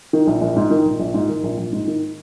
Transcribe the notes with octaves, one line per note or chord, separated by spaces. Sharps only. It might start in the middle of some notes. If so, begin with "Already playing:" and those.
D#3
A#1
A#1
G#2
D#3
A#1
A#1
G#2
D#3
A#1
A#1
G#2
D#3